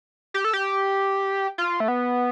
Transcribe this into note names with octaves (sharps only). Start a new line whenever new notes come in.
G4
A4
G4
F4
A3
B3